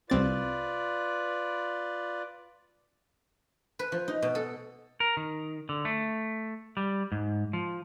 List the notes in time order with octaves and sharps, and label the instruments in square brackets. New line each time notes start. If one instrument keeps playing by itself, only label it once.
[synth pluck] C2 C4 A6 [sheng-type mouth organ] F4 B4 D5
[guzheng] B4
F3
D#4
B2
A4
[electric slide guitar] A#4
D#3
D3
A3
G3
G#2
F3